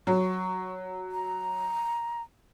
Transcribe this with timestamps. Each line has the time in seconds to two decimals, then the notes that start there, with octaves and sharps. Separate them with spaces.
0.07 F#3 C#6
1.11 A#5